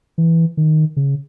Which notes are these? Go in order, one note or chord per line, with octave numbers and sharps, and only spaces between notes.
E3
D#3
C#3